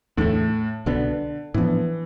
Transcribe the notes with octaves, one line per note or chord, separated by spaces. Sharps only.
E2 A2 D3 A3
C2 B2 D3 B3 D4
A2 E3 F3 B3 D4